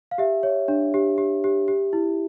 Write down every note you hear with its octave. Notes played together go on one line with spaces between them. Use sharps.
F5
G4 E5
C#5
D4
G4
G4
G4
G4
E4